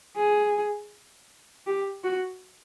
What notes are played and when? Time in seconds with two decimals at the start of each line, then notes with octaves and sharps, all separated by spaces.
0.16 G#4
1.67 G4
2.04 F#4